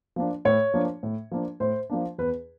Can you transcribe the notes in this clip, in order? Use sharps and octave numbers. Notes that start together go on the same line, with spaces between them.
F3 A#3 D4
A2 C#5
F3 A#3 D4
A2
F3 A#3 D4
A2 C5
F3 A#3 D4
E2 B4